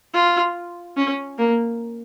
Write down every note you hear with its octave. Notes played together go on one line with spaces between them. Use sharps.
F4
C#4
A#3